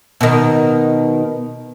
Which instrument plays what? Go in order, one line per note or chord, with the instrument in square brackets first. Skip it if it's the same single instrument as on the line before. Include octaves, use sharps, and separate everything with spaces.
[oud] B2 D#3